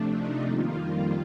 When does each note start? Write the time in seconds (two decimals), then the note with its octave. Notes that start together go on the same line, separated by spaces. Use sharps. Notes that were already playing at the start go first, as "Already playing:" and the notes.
Already playing: C3 F3 A3 D4
0.11 D#4
0.45 F2 D#3 G3 A#3 F4